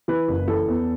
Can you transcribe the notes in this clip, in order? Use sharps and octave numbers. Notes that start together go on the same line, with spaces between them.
E3 B4
F#1
E3 A4
E2